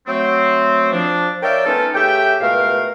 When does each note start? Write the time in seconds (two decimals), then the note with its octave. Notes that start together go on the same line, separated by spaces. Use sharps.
0.07 F#3 A3 C4
0.92 F3 D4
1.43 A#4 C#5 D5 E5 F5 G5
1.66 A3 B3 C#4 D#4 F4 A4
1.94 C#3 A3 G4 E5 G5
2.41 C#2 B2 A3 A#4 F5